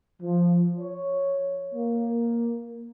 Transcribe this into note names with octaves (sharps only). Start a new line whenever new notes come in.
F3
C#5
A#3